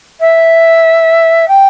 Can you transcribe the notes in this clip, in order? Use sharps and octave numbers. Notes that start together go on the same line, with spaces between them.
E5
G5